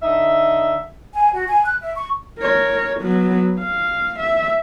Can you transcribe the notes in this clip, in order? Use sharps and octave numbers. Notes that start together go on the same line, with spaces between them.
D3 D#4 E5
G#5
F#4
G#5
F#6
E5
C#6
A#4 C#5
F#3 B3
F5
E5